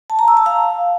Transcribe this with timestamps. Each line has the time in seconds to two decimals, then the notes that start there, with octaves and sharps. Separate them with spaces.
0.10 A5
0.19 A#5
0.28 E6
0.37 A5
0.46 F5